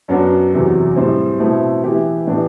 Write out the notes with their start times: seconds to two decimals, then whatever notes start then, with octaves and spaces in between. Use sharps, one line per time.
0.08 F#2 F#3 B3 D4 F#4
0.52 E2 C3 F#3
0.96 A2 G3 C4
1.40 B2 A3 C4 E4
1.83 E3 B3 E4 G4
2.27 A2 E3 B3 D4 G4